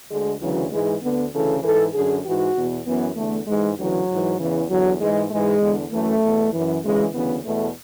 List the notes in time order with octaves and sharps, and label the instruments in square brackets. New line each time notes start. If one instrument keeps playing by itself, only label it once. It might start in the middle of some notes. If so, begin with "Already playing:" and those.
[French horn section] D2 D3 G#3
D2 C#3 E3 F#3
G#2 E3 G#3
D2 D3 B3
D2 C#3 E3 A4
G#2 E3 A4
F#2 D3 G#4
G#2 E3 F#4
E2 B2
F#2 E3 B3
E2 D3 A3
G#2 E3 G#3
D2 C#3 E3 F#3
G#2 E3
E2 C#3 E3
E2 D3 F#3
G#2 E3 G#3
G#2 E3 G#3
E2 D3
F#2 E3 A3
E2 B2
F#2 E3
D2 C#3 E3 G#3
D2 C#3 E3 B3
E2 B2 A3